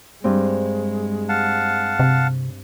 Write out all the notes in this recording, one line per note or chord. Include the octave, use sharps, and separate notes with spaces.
G2 G#3 C4
F5 F#5 A5
C3